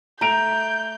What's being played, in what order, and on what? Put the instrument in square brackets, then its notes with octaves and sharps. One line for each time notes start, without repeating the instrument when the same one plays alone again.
[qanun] A3 [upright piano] A#5 D7 F7 [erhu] G6